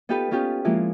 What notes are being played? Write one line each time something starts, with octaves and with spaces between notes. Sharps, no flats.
B3 D#4 F4 G4 A4 B4
B3 C#4 F4 G4
F3 G#3 A#3 E4 F4